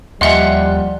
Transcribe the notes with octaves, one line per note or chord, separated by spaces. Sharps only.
D#2 F3 G3 D#5 E5 F#5 G#5 C6